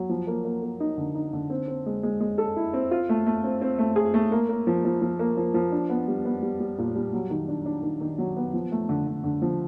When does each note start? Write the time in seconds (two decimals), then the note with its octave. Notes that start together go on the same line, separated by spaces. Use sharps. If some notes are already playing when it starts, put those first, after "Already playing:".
Already playing: F#3
0.09 F3
0.27 A#3
0.45 A#3
0.62 A#3
0.80 D#4
0.97 D3
1.15 D#4
1.33 D3
1.50 C4
1.68 C4
1.86 G#3
2.03 G#3
2.20 G#3
2.38 A4
2.56 E4
2.73 C4
2.91 F4
3.09 A3
3.26 A3
3.44 C4
3.61 C4
3.78 A3
3.96 G#4
4.14 A3
4.32 A#3
4.49 A#3
4.67 F3
4.85 F3
5.02 F3
5.19 A#3
5.37 F3
5.54 F3
5.72 D4
5.89 B3
6.08 G3
6.25 B3
6.43 G3
6.60 G3
6.78 A#2
6.95 G3
7.13 F#3
7.30 D#3
7.49 D4
7.66 D4
7.83 D#3
8.01 D#3
8.18 F#3
8.37 B3
8.53 F3
8.72 A3
8.89 D3
9.07 D3
9.24 D3
9.42 F3